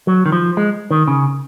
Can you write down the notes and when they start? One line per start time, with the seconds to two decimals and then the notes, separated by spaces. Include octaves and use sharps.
0.07 F#3
0.26 D#3
0.32 F3
0.57 G#3
0.91 D#3
1.07 C#3